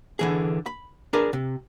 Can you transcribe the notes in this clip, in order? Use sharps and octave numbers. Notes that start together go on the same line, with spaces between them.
D3 E3 G#4
B5
D4 G#4 A#4 B4
C3